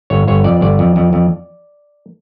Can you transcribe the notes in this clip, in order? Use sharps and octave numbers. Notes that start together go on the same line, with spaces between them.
G1 C#5
G1 C#5
F2 D5
G1 D5
F2
F2
F2